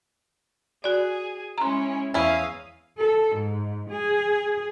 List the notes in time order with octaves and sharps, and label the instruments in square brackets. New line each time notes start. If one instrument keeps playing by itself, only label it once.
[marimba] F#4 D5 [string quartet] G#4
[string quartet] G#3 C#4 E4 [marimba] A#5 C6
[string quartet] E2 F5 D#6 [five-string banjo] C#4 E4
[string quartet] A4
G#2
G#4